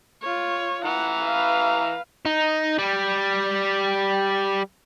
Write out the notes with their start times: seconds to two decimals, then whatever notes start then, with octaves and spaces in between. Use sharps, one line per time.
0.22 F4 C#5
0.85 E3 F#5 A#5
1.23 B4 F5
2.26 D#4
2.79 G3